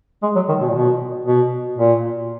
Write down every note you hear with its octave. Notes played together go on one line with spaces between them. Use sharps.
G#3
F#3
D#3
B2
A#2
B2
B2
A#2